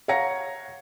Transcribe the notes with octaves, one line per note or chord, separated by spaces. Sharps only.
C#5 F5 F#5 A#5 A#6 C#7